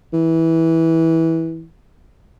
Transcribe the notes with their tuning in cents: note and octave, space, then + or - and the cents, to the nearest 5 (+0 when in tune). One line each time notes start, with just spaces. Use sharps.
E3 -15